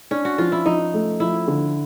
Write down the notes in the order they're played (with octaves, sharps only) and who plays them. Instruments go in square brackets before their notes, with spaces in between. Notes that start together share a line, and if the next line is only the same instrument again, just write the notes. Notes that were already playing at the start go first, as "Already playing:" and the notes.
[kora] C#4 [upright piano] D4
[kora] F#4
[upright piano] F3 [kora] F4
[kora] E4
[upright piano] F3 [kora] D#4
[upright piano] A3
[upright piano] F3 [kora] E4
[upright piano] D3